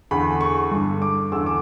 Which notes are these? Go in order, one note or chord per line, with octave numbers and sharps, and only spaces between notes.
E2 D3 B5
C#6
G2 D3
D6
E2 D3 E6
D6